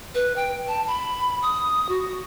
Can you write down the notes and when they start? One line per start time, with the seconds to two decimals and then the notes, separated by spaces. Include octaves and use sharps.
0.15 B4
0.36 G5
0.68 A5
0.87 B5
1.42 D#6
1.89 F#4